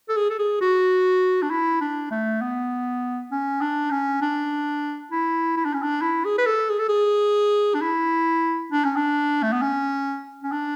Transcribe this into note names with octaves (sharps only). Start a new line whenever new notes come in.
A4
G#4
A4
G#4
F#4
D4
E4
D4
A3
B3
C#4
D4
C#4
D4
E4
E4
D4
C#4
D4
E4
G#4
B4
A4
G#4
A4
G#4
D4
E4
D4
C#4
D4
A3
B3
C#4
C#4
D4